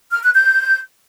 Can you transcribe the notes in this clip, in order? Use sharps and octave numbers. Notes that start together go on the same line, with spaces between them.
F6
F#6
G6